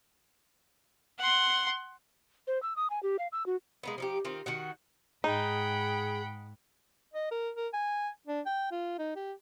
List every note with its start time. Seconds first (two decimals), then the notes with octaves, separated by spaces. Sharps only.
1.19 F#5 C6
2.47 C5
2.63 E6
2.76 D#6
2.90 G#5
3.03 G4
3.19 F5
3.32 E6
3.46 F#4
3.83 G#3 A#3 B3
3.98 F3 D#4 G4
4.25 D#3 C4 F4
4.46 D#3 F#4 F#5
5.24 G#2 D#4 G#4 F#5 G5 B5
7.14 D#5
7.31 A#4
7.56 A#4
7.73 G#5
8.27 D4
8.46 G5
8.71 F4
8.98 D#4
9.15 G4